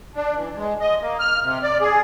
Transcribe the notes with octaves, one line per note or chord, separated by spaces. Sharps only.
D4
E3
G#3
D#5
A#3
F6
C3
D5
G#4